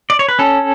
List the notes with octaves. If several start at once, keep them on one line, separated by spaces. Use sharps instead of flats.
D5
C#5
B4
C#4 A4